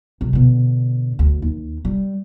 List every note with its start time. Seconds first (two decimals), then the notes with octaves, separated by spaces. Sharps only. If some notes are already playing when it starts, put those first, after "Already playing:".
0.21 C2
0.33 B2 D3
1.19 D2
1.42 D#2
1.85 G3